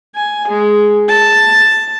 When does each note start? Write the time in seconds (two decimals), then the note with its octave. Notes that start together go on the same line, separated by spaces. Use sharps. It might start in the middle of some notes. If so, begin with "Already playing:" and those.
0.16 G#5
0.48 G#3
1.08 A5